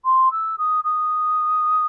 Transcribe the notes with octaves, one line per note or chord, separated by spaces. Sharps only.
C6
E6
D#6
D#6